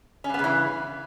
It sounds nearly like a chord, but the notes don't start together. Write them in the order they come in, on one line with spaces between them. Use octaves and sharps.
C#4 G2 B3 C#3 E3